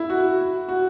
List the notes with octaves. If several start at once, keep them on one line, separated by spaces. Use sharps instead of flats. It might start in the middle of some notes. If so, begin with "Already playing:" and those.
Already playing: E4
F#4
F#4